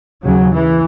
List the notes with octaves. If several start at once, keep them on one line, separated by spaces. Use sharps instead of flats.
D#2 C#3 F#3
E3